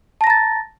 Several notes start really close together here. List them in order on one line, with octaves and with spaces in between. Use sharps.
A5 A#6 A#5 A6